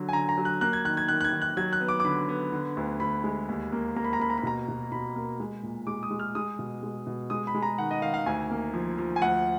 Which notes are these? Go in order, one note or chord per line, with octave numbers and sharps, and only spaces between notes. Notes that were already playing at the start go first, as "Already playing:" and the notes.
Already playing: D3 F#3
G#5
D3 A#5
A#5
F#3
F#6
A#3 F#6
G#6
D#3 F#6
G#6
D#3 F#6
F#6
G#6
D#3
F#6
F#3 G#6
F#6
B3
D6
D6
D3 B5
B3
D3
D2
D2 B5
G#3
D#2
A#3
A#3 A#5
B5
A#5
A#3 B5
A#5
B5
B2 A#5
B2
B2 B5
A#3
G#3
A#2
G#3 D6
D#6
G#3
F6
G#3 D#6
B2
G#3
B2
G#3 D#6
B5
G#3
A#5
D#3 F#5
D#5
D#3 F5
F5
D2 G#5
A#3
F3
F3
G#5
D2 F#5